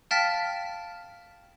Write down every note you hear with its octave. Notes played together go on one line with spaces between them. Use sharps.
F5 G5 A5 F6 A6 B6